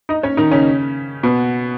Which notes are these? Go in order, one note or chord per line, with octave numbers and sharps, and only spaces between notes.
D#4 D#5
C#4 C#5
D#3 D#4
C#3 C#4
B2 B3